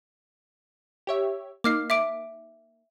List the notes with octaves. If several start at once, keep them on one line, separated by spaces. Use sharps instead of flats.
G4 C#5 E5
A#3 D#4 D6 F6 C7
E5 D6 D7